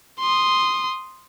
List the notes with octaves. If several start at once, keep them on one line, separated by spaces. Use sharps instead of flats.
C6 D#6